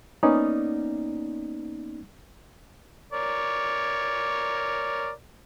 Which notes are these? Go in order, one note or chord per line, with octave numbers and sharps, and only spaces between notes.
A#3 B3 C#4 D#4 D5
A#4 C#5 D5